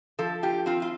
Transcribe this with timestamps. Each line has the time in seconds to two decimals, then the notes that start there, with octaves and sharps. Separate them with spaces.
0.19 F3 A4
0.43 F4 G4
0.66 C4 F4
0.82 F4